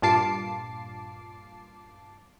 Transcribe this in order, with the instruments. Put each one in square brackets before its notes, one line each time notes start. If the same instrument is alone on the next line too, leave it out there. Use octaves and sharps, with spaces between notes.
[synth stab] G2 A#2 F4 A5 D6 C7